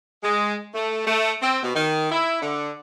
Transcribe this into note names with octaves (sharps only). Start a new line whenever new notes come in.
G#3
A3
A3
C4
B2
D#3
E4
D3